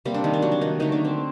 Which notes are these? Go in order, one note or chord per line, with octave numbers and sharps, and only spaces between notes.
C3 G3 A#3
D4
D#3 D#4
D4
F#3 F#4
D4
D#3 D#4
D3 D#3 A3 D#4
D4
C4